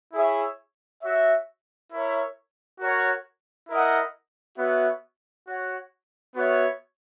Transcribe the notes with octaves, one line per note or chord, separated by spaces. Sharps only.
E4 G#4 C#5 E5
F#4 C#5 E5
E4 A#4 C#5 E5
F#4 A#4 C#5 F#5
E4 A#4 D#5 F#5
B3 F#4 C#5 E5
F#4 C#5 F#5
B3 F#4 C#5 E5